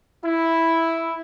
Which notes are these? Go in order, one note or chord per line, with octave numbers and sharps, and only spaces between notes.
E4